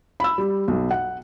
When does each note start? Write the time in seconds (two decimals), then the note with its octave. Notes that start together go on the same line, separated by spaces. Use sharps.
0.20 B5 E6
0.38 G3
0.68 B1
0.91 F#5